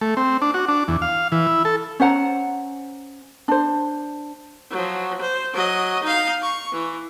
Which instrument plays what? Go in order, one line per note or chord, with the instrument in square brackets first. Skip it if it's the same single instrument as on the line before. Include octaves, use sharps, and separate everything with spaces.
[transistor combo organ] A3
C4
D4
F#4
D4
E2
F5
E3
E4
A4
[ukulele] C#4 C5 F#5 A#5
D4 C5
[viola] F3 F#3
C5
F#3 D#5
D#4 F5
C#6
E3